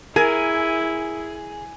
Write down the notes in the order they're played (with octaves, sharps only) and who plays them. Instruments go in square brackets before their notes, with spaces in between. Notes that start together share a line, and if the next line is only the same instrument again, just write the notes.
[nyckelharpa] E4 [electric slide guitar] G#4 [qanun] A#4 [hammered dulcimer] G#5